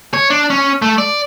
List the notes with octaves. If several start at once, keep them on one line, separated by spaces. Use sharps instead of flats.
C#5
D4
C#4
A3
D5